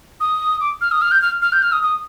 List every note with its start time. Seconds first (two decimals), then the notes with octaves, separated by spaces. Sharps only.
0.20 D#6
0.61 D6
0.81 F6
0.92 D#6
1.02 F6
1.12 G6
1.22 F6
1.42 F6
1.53 G6
1.62 F6
1.72 D#6
1.83 D#6